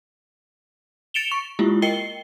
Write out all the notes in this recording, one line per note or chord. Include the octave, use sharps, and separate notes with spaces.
A6 C#7 D7 E7 F7 G7
C#6
G#3 A#3 E4 F4 G4
A#4 D#5 G5 C7 C#7 G7